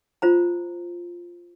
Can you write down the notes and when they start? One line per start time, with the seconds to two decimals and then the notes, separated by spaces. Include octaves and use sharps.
0.22 F4 C5 A#5